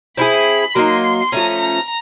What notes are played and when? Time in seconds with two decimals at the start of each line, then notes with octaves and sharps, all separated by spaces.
0.17 C4 E4 G#4 B5
0.74 F#3 A#3 D#4 C6
1.32 F3 A3 C#4 A#5
1.61 A#5